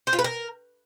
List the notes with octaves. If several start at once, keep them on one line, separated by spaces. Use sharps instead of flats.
C5
F4
B4
A#4